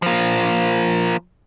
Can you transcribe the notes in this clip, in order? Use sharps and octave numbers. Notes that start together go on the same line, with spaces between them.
F3 A#3